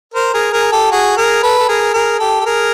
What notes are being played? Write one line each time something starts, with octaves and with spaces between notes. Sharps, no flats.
A#4 C5
G#4 A#4
G#4 A#4
G4 A4
F#4 G#4
G#4 A#4
A4 B4
A4
G#4 A#4
G#4 A#4
G4 A4
A4
G#4 A#4